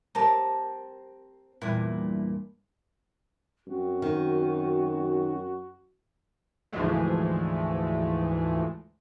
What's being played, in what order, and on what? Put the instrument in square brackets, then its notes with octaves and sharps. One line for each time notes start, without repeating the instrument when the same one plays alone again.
[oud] C4 G4 A#4 [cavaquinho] A5 A#5
[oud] E2 G2 A#2 [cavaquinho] E4
[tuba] F#2 [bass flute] C4 [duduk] F#4
[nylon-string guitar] D#3
[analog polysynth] D2 G#2 E3 F3 G#3 A3